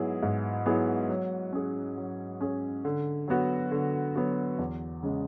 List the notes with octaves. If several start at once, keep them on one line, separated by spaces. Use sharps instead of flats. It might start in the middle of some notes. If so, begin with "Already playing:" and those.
Already playing: G#2 F#3 B3 E4 G#4
G#2
F#3 B3 E4 G#4
F#3
C#4 G#4
F#3
C#4 G#4
D3
F#3 B3 F#4
D3
F#3 B3 F#4
E2
C#3 G#3